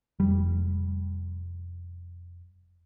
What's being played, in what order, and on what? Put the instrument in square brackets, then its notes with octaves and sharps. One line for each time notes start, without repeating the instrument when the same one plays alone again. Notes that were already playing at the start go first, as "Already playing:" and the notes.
[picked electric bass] F1 G3